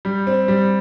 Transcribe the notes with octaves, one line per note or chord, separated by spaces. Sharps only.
G3
C4
G3